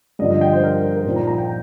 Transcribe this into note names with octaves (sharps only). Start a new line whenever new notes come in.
G2 D3 F3 D#5
D#5
G5
C5
A#4
A#4
A#2 F3 A#3 D#4 C5
A#5
A#5
G5